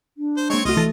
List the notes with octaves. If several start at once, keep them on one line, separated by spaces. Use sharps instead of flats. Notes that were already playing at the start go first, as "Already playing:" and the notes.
D4
C5
G#3 A#3 C4 C#5 C#6
C2 A3 F4 F#4 D#5 D#6
E3 A4 A6